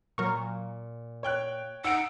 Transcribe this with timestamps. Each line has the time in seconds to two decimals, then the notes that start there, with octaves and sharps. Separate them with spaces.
0.18 A#2 F#3 A#4 C#6
1.23 C#5 G5 F#6
1.85 D#4 F#5 E6 D7